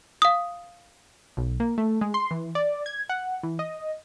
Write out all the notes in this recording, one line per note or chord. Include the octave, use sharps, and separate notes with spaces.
F5 D#6
B1
A#3
A3
G#3
C6
E3
D5
G#6
F#5
E3
D#5